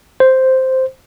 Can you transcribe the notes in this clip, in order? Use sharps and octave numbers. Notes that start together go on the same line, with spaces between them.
C5